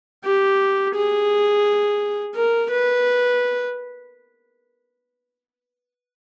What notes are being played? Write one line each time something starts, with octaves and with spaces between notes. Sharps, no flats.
G4
G#4
A#4
B4